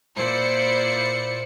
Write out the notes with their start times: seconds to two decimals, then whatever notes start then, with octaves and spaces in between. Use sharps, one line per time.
0.16 A#2 E4 C5 D5 C#7